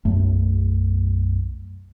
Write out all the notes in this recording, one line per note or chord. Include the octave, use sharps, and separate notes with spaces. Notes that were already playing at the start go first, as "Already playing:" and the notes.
B1 F#2 A3